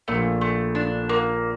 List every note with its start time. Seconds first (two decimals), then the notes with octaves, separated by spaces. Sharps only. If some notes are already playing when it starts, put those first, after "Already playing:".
0.08 A#1 A#2 A3
0.41 A3
0.75 D4
1.09 A#3